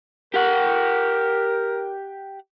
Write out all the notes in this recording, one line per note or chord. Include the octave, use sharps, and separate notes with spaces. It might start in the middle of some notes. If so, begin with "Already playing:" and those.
G4 A#4 F#5